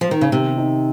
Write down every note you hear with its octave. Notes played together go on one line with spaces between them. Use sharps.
F3
D#3
C#3
C3 D#3
D#4